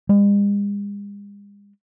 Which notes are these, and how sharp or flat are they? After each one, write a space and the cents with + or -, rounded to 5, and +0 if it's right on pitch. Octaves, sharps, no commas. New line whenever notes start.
G#3 -45